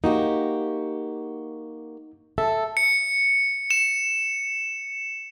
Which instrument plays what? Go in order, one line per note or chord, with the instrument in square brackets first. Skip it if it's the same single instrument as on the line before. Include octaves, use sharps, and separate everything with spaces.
[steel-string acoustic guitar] A#3 F#4 G4 [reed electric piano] D#4
[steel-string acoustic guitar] A4 [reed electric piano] E5
[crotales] C#7
E7